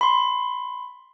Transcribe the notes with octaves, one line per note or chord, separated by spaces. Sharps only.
B5 C6